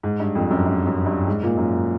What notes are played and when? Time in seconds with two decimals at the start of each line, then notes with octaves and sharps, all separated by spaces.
0.03 G#2
0.20 G2
0.35 F2
0.51 F#2
0.66 G2
0.87 F#2
1.06 G2
1.27 G#2
1.43 A#2
1.57 F#2